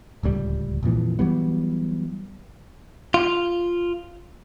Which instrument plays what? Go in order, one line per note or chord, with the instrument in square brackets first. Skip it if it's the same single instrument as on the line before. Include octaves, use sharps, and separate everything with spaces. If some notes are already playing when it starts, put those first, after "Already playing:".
[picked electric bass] D1 C#2 C3 G3
A#1 F2 A#2 E3
E3 F#3 G3 B3
[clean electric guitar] F4